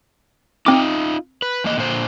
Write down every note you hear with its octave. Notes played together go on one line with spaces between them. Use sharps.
C4 D#4 F4 D6
B4
E2 A#3 D#5
A#2 D3 C5